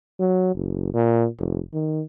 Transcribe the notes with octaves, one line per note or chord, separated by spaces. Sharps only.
F#3
F#1
A#2
F1
D#3